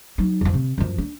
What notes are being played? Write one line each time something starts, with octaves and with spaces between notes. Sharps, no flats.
F#3 D#4
F2 F3
C3
F#2 F3
D4